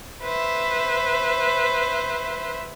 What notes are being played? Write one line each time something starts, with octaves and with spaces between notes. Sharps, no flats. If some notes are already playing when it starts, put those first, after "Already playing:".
B4 C5 E5